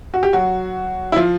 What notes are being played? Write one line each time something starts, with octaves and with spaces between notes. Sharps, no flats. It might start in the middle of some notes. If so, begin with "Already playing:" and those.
F#4
G4
F#3 F#4
E4
F3 F4